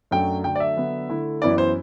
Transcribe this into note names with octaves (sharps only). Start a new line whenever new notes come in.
F#2 F#3 A3 D4 G5
D3 F#3 A3 D4 G5
D5
E5
D3 F#3 B3 D4
D3 A3 E4
F#2 E3 B3 E4 D5
C5